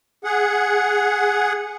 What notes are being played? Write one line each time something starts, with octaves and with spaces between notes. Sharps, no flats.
G#4 F#5